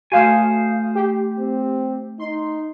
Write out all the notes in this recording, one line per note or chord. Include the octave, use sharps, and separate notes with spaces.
A3 F#4 C5 F5 G#5 D#6
G4
C4
D#4 C6